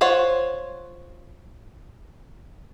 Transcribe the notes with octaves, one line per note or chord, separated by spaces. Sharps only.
F4 C5 C#5 F#5